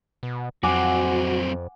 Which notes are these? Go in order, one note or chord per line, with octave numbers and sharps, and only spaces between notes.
B2
F2 F#3 C4 F#4 F#5 G#5 D6